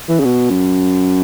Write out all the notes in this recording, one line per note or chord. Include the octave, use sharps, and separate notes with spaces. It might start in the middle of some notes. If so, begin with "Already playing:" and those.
E3
C#3
B2
F#2